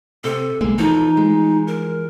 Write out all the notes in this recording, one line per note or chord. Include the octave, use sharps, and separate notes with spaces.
C3 A4
B1 G#3 A#3
E2 E3 F3 D#4 A4
G#3
A#4